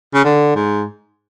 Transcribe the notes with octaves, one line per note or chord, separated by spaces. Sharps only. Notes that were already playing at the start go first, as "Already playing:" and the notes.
C#3
D3
G#2